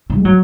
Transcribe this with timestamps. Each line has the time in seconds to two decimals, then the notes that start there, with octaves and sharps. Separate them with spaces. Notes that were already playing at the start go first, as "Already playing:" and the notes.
0.10 D3
0.17 G#3
0.25 F#3